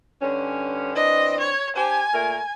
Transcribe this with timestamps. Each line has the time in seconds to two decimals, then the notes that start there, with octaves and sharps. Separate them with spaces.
0.22 G2 D3 C#4
0.96 E3 C4 D4 D#5
1.40 C#5
1.76 D4 G4 C5 G#5
2.13 A#2 A3 A#4